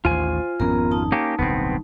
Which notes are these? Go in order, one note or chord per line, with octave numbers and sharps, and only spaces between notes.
A1 D#2 F4 C5 G#5
G#1 F2 B3 C#4 A#4 A#5
D#4 A5
A#3 C#4 G4
D1 B1 G2 B3 C4